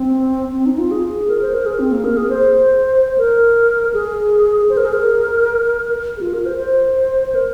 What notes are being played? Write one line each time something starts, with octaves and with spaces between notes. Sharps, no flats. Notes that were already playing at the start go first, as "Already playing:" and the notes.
Already playing: C4
C4
D#4
F4
G#4
A#4
C5
A#4
G#4
C4
A#3
A#4
G#4
C5
A#4
G#4
C5
A#4
G#4
A#4
G#4
F4
A#4
C5
C5
C5
A#4